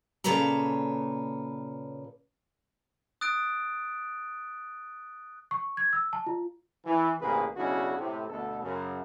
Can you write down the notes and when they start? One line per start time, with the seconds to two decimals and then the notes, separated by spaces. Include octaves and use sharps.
0.24 A#2 C#3 A4 B4 C#5 A#5
3.21 D#6 F#6 A6 D7
5.51 C#6
5.77 G#6
5.93 E6
6.13 A5
6.27 F4
6.86 E3
7.20 A1 G2 C3 A#3 G#4 B4
7.56 B1 C#3 C#4 D4 E4 F#4
7.98 A2 C3
8.28 D2 B2 A4
8.62 F#2 C#3